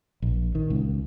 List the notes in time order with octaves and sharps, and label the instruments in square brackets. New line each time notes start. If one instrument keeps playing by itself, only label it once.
[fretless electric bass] A#1
D#3
C#2